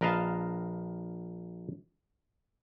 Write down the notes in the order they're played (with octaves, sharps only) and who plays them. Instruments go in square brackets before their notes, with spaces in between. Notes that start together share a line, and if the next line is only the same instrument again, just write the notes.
[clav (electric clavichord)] A#1 A#4 B4 D#5 F5 A5